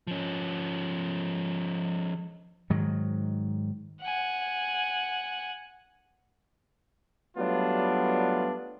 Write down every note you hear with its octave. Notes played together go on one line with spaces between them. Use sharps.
F3 C#4
G#2 D#3 F#3
F#5 G#5
F#3 G3 A3 B3 D4 F4